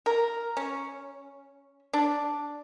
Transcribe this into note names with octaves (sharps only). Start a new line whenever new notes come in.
A#4
C#4
D4